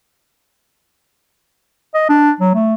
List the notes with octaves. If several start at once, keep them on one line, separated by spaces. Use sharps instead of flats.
D#5
D4
F#3
A3